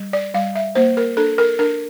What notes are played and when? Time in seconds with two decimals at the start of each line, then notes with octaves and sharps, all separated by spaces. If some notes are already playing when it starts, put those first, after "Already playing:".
Already playing: G3
0.13 D5
0.34 G3 F5
0.55 E5
0.75 A#3 C5
0.97 A#4
1.17 D4 A4
1.38 A#4
1.59 D4 A#4